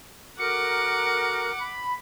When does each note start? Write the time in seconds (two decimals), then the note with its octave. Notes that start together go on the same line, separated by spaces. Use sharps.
0.39 F#4 A4 A#4 F#5 D6 C#7
1.60 B5